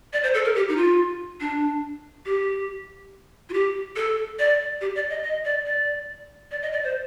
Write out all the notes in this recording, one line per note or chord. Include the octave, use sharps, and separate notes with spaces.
D5
C5
A4
A#4
G4
D#4
F4
D4
G4
F4
G4
A4
D5
G4
D5
D#5
D#5
D5
D5
D5
D#5
D5
C5